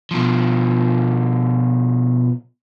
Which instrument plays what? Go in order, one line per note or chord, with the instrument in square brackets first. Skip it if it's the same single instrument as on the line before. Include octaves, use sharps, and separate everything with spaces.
[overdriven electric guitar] B2 F3